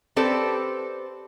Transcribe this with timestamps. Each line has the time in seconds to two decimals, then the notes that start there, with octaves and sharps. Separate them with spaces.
0.16 C4 G4 A4 B4 D5